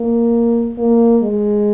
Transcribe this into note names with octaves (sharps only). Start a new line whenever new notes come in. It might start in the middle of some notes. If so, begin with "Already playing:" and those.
Already playing: A#3
A#3
G#3